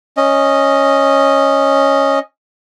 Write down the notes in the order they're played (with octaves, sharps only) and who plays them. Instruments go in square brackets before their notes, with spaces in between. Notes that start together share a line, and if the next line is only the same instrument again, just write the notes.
[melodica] C#4 D#5